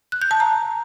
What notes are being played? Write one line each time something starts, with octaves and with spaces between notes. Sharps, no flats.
F#6
G6
A5
A#5